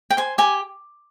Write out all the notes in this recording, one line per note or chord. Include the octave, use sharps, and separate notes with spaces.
G5
C5 G#5
G4 G#5